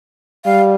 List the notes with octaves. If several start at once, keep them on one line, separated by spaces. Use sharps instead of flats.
G3 F5